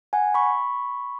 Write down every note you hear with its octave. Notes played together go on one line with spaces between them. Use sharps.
F#5 G#5
B5 C#6